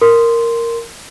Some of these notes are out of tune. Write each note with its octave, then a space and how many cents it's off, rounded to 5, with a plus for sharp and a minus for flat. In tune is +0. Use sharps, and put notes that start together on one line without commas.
A#4 -5 C6 -10